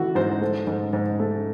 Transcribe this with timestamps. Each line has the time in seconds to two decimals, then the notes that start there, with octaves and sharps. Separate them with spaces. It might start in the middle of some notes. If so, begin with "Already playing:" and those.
Already playing: E3 A3 F#4
0.15 G#2 C5
0.41 A3
0.67 G#2
0.93 G#2
1.19 A3